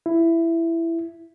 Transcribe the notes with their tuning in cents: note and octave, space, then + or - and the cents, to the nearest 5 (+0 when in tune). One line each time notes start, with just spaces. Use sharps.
E4 +10